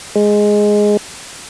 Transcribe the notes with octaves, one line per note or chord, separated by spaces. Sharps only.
G#3